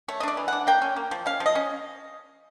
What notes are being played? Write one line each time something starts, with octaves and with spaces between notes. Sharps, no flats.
A3 C#5
D#5
D4 D5
E3
D4 F#5
A#3 G5
C#4
A#3
F3
C#4 F5
F3
D#5
C#4